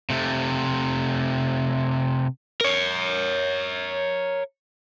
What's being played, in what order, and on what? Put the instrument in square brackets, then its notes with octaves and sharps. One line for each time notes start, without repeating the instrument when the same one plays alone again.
[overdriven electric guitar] C3 A3
A#4 C#5